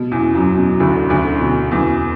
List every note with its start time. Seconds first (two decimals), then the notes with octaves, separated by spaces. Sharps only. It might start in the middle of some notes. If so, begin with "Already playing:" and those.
Already playing: B2
0.12 E2 E3
0.35 F#2 F#3
0.58 B2
0.80 D2 D3
1.10 D2 D3
1.41 B2
1.71 E2 E3